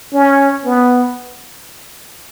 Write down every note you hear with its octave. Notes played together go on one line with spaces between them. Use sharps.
C#4
B3